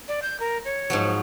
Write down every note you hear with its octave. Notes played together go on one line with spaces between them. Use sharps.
D5
G6
A#4
C#5
G#2 F3 F#3